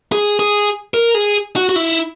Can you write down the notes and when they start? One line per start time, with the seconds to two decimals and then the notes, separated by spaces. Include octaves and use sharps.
0.12 G#4
0.39 G#4
0.94 A#4
1.14 G#4
1.56 F#4
1.69 F#4
1.76 E4